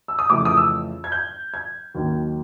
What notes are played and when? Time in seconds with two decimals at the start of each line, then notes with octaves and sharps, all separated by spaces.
0.08 E6
0.19 D#6
0.30 F2 C#3 E3 A3 D6
0.45 D#6
0.57 E6
1.04 G#6
1.12 G6
1.54 G#6
1.94 D#2 D#3 F#3 A#3